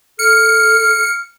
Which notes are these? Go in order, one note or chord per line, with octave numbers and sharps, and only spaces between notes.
A4 F6 C#7